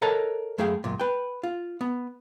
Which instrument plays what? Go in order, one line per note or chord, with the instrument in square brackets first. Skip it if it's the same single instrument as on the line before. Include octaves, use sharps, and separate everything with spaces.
[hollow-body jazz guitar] A4 A#4 C#5 D#5 F#5 A5
F#2 A3 G#4 F5 G5
C#2 F#2 A#2
B4 G5
F4
B3